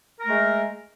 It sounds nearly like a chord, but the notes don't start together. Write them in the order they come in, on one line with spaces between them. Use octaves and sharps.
A#4 A3 G#3